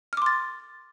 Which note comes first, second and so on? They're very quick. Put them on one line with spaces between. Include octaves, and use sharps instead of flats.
F6 D6 C6 A6